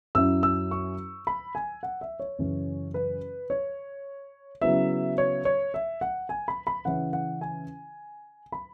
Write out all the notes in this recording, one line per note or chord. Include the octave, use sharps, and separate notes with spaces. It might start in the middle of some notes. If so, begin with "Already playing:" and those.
F#2 F#3 C#4 E4 E6
E6
C#6
B5
G#5
F#5
E5
C#5
F#2 C#3 E3 C#4 E4
B4
C#5
C#3 F#3 B3 E4 E5
C#5
C#5
E5
F#5
G#5
B5
B5
C#3 E3 C#4 E4 F#5
F#5
G#5
B5